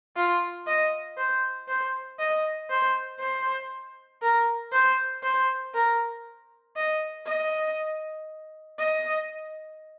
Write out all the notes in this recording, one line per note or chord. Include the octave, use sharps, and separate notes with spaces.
F4
D#5
C5
C5
D#5
C5
C5
A#4
C5
C5
A#4
D#5
D#5
D#5